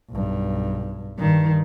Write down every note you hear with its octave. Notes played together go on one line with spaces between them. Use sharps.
B1 G2
G2 D#3